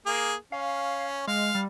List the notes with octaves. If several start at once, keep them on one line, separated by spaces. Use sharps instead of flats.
A#3 G#4
C#4 F5
G#3 F5
G3